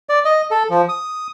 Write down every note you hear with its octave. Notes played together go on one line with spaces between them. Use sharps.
D5
D#5
A4
F3
D#6